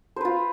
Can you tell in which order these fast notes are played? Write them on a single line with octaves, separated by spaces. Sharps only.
C5 B4 F4